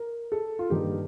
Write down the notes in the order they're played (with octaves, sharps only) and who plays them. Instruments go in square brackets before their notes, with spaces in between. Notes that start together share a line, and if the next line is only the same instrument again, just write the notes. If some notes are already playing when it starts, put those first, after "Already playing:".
Already playing: [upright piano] A#4
A4
F4
[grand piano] G2 D#3 A#3 D#4 [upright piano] G4